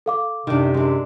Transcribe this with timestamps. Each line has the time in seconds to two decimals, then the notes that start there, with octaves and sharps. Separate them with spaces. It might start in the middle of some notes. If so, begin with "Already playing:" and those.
0.06 A4 F5 D6
0.47 F#2 C3 D#3 D4
0.74 G#3 D4